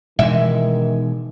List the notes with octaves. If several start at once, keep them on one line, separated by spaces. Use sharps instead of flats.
B2 D#3 E3 G#3 E5